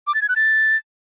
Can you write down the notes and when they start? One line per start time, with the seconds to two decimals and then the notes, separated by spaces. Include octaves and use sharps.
0.07 D6
0.15 A6
0.22 G#6
0.29 F#6
0.36 A6